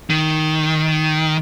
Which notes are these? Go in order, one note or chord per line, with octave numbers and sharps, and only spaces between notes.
D#3